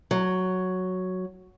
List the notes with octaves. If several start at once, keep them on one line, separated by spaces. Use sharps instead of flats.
F#3